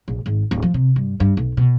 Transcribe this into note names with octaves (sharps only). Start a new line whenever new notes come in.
A#1
G#1
D1
F3
C3
G2
G2
B1
B2